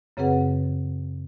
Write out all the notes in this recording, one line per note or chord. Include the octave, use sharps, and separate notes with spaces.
F#2 C#3 C4 G#4 B4 F#5